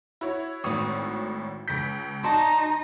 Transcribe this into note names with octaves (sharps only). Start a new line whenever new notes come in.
E4 F#4 C#5
G#1 A2 B3 C4 C#6 D#6
C#2 G6 B6
D#4 F#4 D5 A5 C6